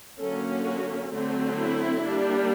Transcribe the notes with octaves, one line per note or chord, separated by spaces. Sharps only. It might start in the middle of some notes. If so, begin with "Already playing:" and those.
D3 F#3 A#3 C#4 A4
F#4
D3 F#3 A3 C4
E4
G3 A#3 D4